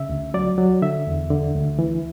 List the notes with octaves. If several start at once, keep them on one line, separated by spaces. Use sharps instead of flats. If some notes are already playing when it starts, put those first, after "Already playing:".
Already playing: C#3 E5
D2
F#3 D5
F#3
D3 E5
E2
D3
D2
E3